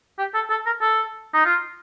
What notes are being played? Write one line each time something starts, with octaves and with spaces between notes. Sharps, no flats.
G4
A4
A4
A#4
A4
D#4
F4